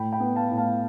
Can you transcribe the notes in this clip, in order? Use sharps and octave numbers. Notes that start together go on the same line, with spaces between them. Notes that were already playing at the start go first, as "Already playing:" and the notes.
Already playing: A2 G5 B5
G5 B5
B3
F5 A5
A2
F5 A5